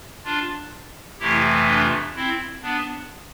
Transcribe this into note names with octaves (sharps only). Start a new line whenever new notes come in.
D4 F4
F2 C3 E3 A3 E4 G4
D4 F4
C4 E4
B3 D4